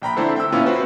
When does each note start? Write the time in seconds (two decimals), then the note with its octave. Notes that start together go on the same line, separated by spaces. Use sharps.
0.02 A#1 G5 A#5 B5
0.16 D3 A3 C4 D4 E4 C5
0.36 G5 E6
0.52 A#2 B3 C#4 E4 F4
0.66 C4 F#4 B4 C5